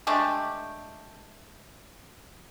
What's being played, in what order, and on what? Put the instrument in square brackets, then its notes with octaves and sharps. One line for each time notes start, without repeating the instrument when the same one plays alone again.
[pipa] G#3 A3 D4 G4